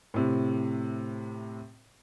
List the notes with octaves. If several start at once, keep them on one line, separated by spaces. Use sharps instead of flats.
A2 C3